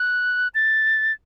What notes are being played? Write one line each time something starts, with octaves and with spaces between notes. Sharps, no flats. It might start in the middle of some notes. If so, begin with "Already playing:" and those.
Already playing: F#6
A6